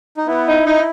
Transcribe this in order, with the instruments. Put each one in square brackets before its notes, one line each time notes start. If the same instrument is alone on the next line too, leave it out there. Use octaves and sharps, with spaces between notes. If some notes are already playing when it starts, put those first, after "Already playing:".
[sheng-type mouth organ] D#4
[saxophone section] B3 [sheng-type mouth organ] E4
[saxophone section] D#4
D#4